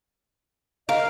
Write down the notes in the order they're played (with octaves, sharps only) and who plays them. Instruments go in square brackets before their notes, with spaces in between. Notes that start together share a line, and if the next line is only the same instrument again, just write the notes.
[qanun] A#4 [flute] D#5 [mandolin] F5